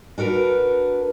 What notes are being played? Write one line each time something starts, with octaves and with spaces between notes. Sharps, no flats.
D4 F#4 A#4 B4